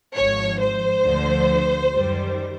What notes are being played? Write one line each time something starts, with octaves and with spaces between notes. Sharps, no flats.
G#1 G#2 F3 C#5
C5
D2 D3 F3
F#2 D#3 G3